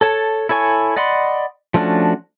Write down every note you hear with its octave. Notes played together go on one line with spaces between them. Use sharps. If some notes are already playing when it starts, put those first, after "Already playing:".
A4 C#5 A5
E4 A4 C#5 G#5 C#6
D5 D#5 F#5 B5 C6
F3 A3 C#4 D4 F#4